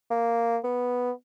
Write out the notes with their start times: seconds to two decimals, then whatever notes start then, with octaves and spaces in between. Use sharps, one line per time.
0.10 A#3
0.64 B3